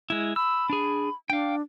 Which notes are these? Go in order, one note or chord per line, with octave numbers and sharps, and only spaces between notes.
G#3 E4
B5 E6
D4 G#4
D4 F5 G5